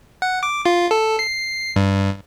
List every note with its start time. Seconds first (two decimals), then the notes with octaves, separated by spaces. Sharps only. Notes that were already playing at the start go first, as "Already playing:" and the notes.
0.22 F#5
0.43 D6
0.66 F4
0.91 A4
1.19 C7
1.76 G2